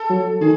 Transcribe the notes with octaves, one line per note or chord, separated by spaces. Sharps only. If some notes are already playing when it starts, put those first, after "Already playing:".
Already playing: A4
F#3
D#3 G#4